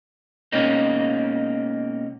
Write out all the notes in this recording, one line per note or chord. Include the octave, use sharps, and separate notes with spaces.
B2 G#3 A#3 C4 C#4 D#4